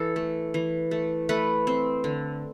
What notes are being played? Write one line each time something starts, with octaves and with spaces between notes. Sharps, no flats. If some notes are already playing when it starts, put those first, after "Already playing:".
Already playing: E3 A4
A3
E3
A3
A3 B4
C4
D3